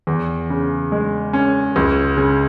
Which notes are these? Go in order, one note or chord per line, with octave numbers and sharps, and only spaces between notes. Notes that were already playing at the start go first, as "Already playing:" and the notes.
E2
C#3
G#3
C#4
C#2
C#3